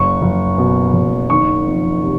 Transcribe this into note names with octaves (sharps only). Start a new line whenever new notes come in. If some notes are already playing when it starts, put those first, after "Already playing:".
Already playing: F#1 C#6
F#1
B2
F#1
D#3 C#6
F2
C3